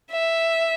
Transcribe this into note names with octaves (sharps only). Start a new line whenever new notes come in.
E5